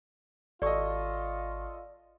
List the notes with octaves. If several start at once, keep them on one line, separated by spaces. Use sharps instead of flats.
G#1 F4 A4 D5 D#5 C#6